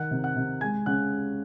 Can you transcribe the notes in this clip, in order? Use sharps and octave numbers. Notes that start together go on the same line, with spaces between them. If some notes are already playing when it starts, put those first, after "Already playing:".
Already playing: D#3 F#5 F#6
C3
F#5 F#6
C3
G#3 G#5 G#6
C#3 F#5 F#6